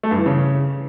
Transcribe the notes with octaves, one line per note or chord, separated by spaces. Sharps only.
A3
G2
E3
C#3